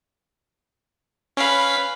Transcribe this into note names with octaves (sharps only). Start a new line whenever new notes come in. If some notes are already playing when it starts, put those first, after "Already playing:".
C#4 B4 F5